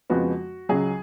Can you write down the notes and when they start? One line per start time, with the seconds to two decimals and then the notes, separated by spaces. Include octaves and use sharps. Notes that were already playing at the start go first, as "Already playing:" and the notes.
0.10 F2 C#3 F3 G#3 B3 F#4
0.69 C#2 C#3 F#3 G#4